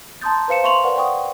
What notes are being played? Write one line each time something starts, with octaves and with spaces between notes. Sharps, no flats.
A5 A#5 C6 D#6 G6 A6
B4 C5 F5 C#7 E7
E5 C6 C#6 F7 F#7
A#4 B4 D5 F#5
F#5 G5 C#6 D#6